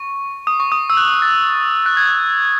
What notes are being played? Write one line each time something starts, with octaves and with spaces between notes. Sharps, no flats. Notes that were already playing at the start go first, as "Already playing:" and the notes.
Already playing: C#6
D#6
C#6
D#6
E6
F#6
A6
F#6
G#6